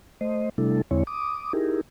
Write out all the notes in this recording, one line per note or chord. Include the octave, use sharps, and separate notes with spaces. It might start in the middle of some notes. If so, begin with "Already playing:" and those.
A3 C5 D#5
C3 G3 A3 D4 E4 A4
E2 D3 G#3 C4 E4 C#5
D6 D#6
D#4 E4 G4 G#4 A#4